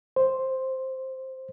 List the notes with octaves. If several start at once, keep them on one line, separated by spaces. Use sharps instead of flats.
C5